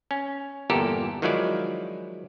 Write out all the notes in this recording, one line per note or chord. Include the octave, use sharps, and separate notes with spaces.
C#4
G1 E2 A#2 G4 A4 A#4
D#3 F3 F#3 G#3 E4 D5